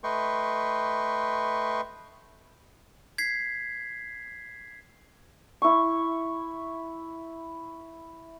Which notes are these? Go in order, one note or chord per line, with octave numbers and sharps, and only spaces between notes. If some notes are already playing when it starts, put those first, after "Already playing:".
A3 B4 D#5 G5 C6 C#6
G#6 B6 C7
E4 C#6